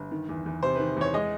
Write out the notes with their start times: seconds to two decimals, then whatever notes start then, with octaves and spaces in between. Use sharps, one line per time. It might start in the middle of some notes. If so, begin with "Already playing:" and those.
Already playing: G1
0.11 D#3
0.29 E2
0.46 E2
0.63 C3 C5
0.76 D#3 B4
0.97 E2 C#5
1.14 G#3 D#5